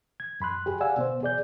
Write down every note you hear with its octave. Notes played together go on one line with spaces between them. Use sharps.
G#6
F#2 B5 C6 F#6
G4 G#4
D5 F5 F#5 G#5 E6
B2 B3 C5
G#4 D5 G6